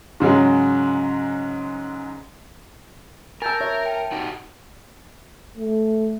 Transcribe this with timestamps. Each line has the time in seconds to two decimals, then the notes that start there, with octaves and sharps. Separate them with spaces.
0.20 G#2 C#3 F#3 G#3
3.42 A#4 G#5 A5 E6 G6 A6
3.61 C#5 E5
3.86 G5 A5
4.12 D#4 F#4 G4
5.57 A3